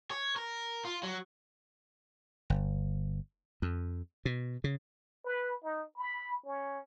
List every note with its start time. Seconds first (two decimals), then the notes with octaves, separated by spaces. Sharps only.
0.11 C#5
0.36 A#4
0.85 F4
1.03 F#3
2.50 G1
3.62 F2
4.25 B2
4.64 C#3
5.25 B4
5.63 D#4
5.97 B5
6.46 C#4